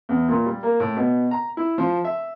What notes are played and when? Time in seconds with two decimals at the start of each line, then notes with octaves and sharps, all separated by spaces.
0.09 E2
0.29 A#2
0.46 G3
0.63 A#3
0.80 A2
0.97 B2
1.31 A#5
1.57 E4
1.78 F3
2.05 E5